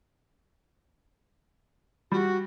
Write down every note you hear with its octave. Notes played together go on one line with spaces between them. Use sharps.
G3 F#4